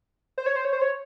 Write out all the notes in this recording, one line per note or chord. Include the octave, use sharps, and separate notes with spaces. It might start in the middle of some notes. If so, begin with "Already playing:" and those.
C5
C#5
C5
C#5
C5
C#5